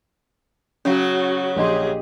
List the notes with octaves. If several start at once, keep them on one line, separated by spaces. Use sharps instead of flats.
C#3 F#3 C#4 F#4
A#1 G4 G#4 D#5 C6